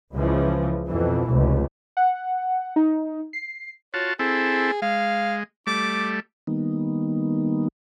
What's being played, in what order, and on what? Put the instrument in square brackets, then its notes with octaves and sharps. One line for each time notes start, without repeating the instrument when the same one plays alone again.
[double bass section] C#2 C#3 E3 F3
F2 B2 E3
F1 C#2
[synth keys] F#5
D#4
C7
[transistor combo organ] F4 F#4 A5 [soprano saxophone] C#5
[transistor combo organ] C4 E4 A4 [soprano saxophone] G#4
[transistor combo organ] G#3 [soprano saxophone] F5
[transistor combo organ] G3 A3 [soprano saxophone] D6
[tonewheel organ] D#3 G3 A#3 B3 D#4